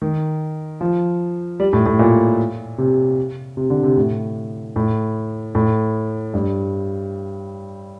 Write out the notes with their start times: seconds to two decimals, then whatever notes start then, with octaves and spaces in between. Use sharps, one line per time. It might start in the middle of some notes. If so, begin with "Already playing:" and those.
0.02 D#3
0.81 F3
1.60 G3
1.73 A2
1.86 A2
1.99 A#2
2.78 C3
3.57 C3
3.70 D3
3.83 C3
3.97 A2
4.76 A2
5.55 A2
6.34 G2